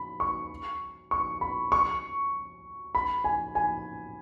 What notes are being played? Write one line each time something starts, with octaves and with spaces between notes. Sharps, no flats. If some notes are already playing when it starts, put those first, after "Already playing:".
Already playing: B5
C#6
C#6
B5
C#6
B5
G#5
G#5